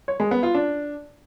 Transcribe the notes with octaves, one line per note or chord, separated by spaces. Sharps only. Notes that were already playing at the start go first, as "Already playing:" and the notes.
C#5
G#3
B3
F4
D4